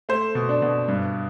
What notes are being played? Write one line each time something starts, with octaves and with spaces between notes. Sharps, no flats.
A3 C5
B2
D4
B2
G2